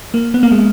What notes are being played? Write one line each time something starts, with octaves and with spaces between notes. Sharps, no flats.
A#3
B3
A#3
G#3